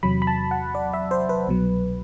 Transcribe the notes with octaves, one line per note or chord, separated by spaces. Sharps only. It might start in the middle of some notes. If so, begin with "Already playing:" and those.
E2 C3 F#3 B5
B5
A5
F#5
D5
E5
C5
B4
C2 B2 F#3